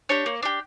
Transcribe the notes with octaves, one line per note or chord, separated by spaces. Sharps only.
D4 G4 C#5
A#3
D4 G4